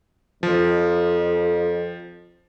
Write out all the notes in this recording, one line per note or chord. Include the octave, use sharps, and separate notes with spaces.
F2 F3